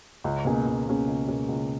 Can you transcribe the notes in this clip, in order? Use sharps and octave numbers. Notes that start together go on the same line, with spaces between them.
C#2
B2 A#3 C#4 G#4
C#2
B2 A#3 C#4 G#4
C#2
B2 A#3 C#4 G#4
C#2